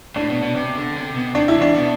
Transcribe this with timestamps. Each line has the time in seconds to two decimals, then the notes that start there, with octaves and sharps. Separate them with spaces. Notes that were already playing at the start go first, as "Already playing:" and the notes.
0.16 A2 D4
0.30 B2
0.42 B2
0.56 C3
0.76 D3
0.96 C3
1.15 B2
1.35 C3 D4
1.48 E4
1.55 E3
1.62 D4
1.74 B2